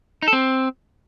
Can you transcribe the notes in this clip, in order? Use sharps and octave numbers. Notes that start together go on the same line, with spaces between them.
D#4
A4
C4